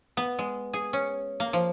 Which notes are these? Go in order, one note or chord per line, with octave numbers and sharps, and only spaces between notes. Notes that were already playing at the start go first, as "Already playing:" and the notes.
B3
G#3
G#4
C#4
A#3
F3